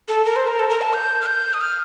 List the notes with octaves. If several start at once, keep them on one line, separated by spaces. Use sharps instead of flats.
A4
A#4
C5
A#4
A4
A#4
A5
G6
F6
G6
D#6
F6